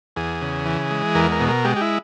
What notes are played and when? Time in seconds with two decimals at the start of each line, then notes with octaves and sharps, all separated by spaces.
0.16 E2 G#4
0.41 C#3
0.66 E3
0.91 G#3
1.15 E2 A#4
1.32 A#4
1.40 B2
1.49 A#4
1.65 G#3 G4
1.76 G4
1.81 E4